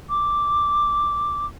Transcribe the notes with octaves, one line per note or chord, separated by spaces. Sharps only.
D6